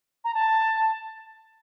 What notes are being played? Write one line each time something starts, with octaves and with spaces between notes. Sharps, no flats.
A#5
A5